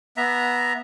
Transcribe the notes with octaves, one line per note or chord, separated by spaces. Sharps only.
B3 E5 A#5